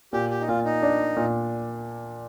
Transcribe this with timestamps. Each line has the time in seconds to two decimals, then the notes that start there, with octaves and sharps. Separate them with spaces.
0.13 A#2 G4
0.30 G4
0.41 D#4
0.48 A#2 F4
0.65 D#4
0.82 D4
1.16 A#2